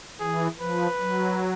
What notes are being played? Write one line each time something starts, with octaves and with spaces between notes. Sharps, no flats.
E3 G#4
F3 B4
F#3